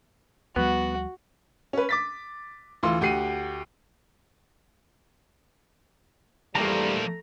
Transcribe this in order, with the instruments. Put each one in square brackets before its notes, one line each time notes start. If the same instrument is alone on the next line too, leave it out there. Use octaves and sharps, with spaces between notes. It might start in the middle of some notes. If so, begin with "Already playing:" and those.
[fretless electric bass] D2 F3 G3 [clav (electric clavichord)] B3 [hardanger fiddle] F#4
[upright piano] C#4 B4
D6 A6 B6
D2 E3 F4 C6
D2 G4 F#5 C7 D#7
[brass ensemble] E2 G3 [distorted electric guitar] F3 A#3 [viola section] A3 [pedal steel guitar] A#5